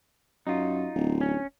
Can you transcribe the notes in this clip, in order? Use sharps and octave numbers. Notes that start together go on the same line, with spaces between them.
F#2 D#4 F4
D1
C#4